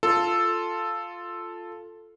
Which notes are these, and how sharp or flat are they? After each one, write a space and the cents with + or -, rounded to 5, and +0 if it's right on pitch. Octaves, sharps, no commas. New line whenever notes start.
F4 +0 A4 +0